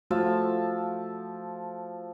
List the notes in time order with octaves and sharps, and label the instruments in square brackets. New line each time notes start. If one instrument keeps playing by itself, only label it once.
[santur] F3 E5 A5 [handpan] A3 F4 F#4